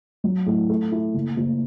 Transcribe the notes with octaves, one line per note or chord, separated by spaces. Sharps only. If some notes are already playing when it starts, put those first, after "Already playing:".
F#3
A2
A3
E4
F#1
F#1